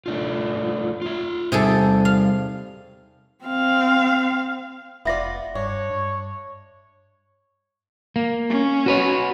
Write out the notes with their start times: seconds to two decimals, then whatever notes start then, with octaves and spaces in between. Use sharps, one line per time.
0.06 A3 D4 F4
1.02 F4 E5
1.52 C3 G3 D#4 G#4 A4
2.05 F5
3.44 C4 F5
5.05 F1 B3 F4 D5 E5 A#6
5.55 G2 D4 C#5
5.90 G2
8.16 A#3
8.50 C#4
8.86 F#4 B4 C#5